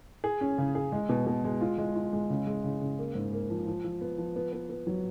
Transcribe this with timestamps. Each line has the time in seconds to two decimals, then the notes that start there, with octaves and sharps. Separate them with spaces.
0.24 G#4
0.41 C#4
0.58 C#3
0.75 G#4
0.92 G#3
1.09 B2
1.27 B2
1.44 G#3
1.61 F4
1.78 G#3
1.95 F4
2.13 G#3
2.30 C#3
2.47 G#3
2.64 C#3
2.81 C#3
2.99 A#3
3.15 G#2
3.33 A#3
3.50 F3
3.67 F3
3.84 F3
4.01 B3
4.18 F3
4.36 B3
4.53 B3
4.69 B3
4.87 F#3